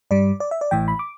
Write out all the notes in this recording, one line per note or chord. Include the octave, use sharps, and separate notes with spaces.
G2 G3 D5
D5
E5
D5
A1 A2 E3 G5
B5
D6